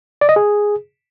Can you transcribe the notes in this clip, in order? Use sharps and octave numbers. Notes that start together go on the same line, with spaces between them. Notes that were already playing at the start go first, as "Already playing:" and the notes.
D5
D#5
G#4